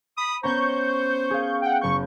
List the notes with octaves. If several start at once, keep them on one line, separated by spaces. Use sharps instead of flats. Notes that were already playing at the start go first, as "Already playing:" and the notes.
B5 D#6
B3 C#4 C5 A#5 C#6 G6
G#4 F5
F#5 G5
F#1 C#6 G6